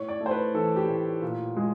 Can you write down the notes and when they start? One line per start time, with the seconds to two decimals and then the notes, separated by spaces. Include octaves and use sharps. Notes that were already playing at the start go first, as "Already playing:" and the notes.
Already playing: A2 C#5
0.08 D5
0.21 A3
0.26 C5
0.31 B4
0.54 E3 A4
0.76 G4
0.88 A2
1.22 A#2
1.57 G#3